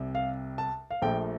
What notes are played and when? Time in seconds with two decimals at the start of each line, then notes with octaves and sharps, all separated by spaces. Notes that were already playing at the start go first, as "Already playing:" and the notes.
Already playing: C2 C3 G3
0.15 F5
0.58 A5
0.91 F5
1.02 A#1 A#2 F3 A3 G5